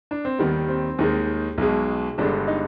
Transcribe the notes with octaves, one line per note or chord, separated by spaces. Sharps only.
D4
C4
D#2 D#3 G3 B3
C4
D#2 D#3 G#3
B1 B2 G#3
G1 G2 D3 G#3 D4
D#4